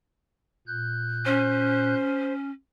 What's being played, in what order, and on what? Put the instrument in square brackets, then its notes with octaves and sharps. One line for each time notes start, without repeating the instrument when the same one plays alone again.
[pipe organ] A#2 F#6 G6
[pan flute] C#4 [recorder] C5